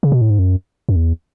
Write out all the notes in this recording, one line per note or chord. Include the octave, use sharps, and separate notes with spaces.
C#3
B2
A2
G#2
F#2
F#2
E2